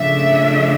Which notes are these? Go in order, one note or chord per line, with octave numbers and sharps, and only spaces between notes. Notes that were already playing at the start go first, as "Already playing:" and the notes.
Already playing: C#3 F3 A3 D4 E5